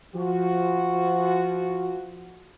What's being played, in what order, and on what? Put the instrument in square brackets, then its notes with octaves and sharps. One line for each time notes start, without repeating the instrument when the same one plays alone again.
[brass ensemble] F3 F#4